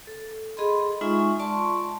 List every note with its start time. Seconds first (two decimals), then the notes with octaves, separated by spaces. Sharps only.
0.07 A4
0.57 G#4 D#5 B5 C6
1.01 G#3 D#4 F4 E5 G#5 C#6
1.39 D5 A5 C6 C#6